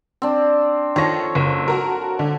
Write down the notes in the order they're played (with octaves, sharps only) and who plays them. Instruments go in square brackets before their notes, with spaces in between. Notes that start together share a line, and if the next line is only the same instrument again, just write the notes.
[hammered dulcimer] C4 D4
[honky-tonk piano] D#3 A#6 [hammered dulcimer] F3 A4 C#5
[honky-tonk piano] F#1
F#4 A#4
D3